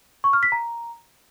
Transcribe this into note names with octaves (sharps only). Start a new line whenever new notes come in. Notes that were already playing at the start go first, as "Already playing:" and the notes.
C#6
F6
B6
A#5